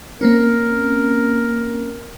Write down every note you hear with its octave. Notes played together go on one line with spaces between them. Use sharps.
A#3 C4 C#4 A#4